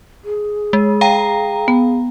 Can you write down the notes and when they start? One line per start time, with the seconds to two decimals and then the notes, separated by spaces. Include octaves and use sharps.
0.24 G#4
0.73 G#3
1.01 F5 G5 A#5
1.68 B3